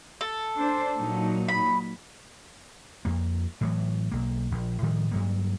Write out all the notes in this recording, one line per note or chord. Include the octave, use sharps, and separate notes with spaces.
A4
D4 C5
A#2 F#3 D#4
B5
F2 A#3
A2 E3 F#3
B1 A#3
A#1
A2 D#3 F3 G3
G2 F#3 A#3